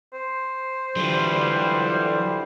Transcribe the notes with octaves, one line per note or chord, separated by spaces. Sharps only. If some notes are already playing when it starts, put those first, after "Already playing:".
C5
D3 E3 F#3 G3 F4